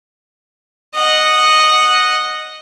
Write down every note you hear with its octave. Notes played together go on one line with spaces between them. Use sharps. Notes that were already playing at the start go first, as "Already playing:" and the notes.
D#5 F#5